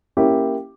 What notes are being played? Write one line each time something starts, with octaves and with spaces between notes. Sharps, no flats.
A#3 C#4 E4 G4